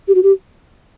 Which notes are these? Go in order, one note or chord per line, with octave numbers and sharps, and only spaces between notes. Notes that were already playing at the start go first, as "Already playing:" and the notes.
G4
F#4
G4